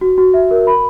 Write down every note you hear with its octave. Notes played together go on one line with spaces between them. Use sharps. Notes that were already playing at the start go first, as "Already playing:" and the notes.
F#4
F#4
E5
A#4
B5